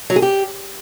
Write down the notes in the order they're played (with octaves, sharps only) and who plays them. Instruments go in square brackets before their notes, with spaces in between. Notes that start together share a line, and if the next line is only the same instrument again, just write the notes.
[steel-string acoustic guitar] F#3
G#4
G4